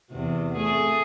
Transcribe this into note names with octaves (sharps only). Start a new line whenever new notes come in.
E2 C3
A3 G#4